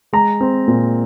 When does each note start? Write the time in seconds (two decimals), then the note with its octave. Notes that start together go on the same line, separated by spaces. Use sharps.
0.13 G#3 A#5
0.41 C4
0.68 A#2